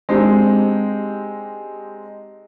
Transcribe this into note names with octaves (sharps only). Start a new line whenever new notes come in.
G#3 C4 D4 D#4 G4